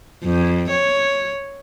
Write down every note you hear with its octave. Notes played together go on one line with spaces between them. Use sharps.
F2
C#5